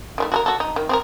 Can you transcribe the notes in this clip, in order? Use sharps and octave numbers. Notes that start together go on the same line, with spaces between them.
D#3 G#3 A3
F#4 A4 A#4
F#4 A4
D#4
D#3
C4 G#4 A#4